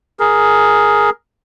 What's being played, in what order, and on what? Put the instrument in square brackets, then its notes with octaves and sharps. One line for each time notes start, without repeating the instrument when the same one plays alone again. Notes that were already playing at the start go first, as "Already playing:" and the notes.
[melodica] G#4 A#4